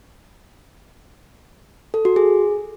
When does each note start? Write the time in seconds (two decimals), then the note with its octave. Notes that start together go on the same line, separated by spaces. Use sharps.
1.94 A4
2.05 F#4
2.16 G#4